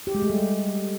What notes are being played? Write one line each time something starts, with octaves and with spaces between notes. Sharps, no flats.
G4
G#3
A3
G3